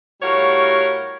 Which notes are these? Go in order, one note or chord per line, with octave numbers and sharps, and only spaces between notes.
A2 G3 F#4 A#4 C#5 F5